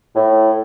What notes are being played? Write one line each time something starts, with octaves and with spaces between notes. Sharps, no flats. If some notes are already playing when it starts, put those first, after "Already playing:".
A2